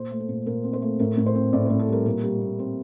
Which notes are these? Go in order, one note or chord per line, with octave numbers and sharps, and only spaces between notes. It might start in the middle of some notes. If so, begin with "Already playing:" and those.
Already playing: A#2 C5
A3
A4
A#2
A#2 A#4
C4
C5
A3
A2 A#4
A2
C5
C4
A2 D5
A2 C5
A4
G3 A#4
A#2 A#4
G3
A#2
C4